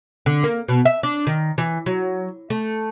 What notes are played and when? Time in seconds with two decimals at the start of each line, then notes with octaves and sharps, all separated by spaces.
0.26 D3
0.44 A#3
0.68 B2
0.85 E5
1.03 D4
1.27 D#3
1.58 E3
1.86 F#3
2.50 A3